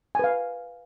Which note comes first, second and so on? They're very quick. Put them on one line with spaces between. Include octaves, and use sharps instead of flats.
G#5 B4 F5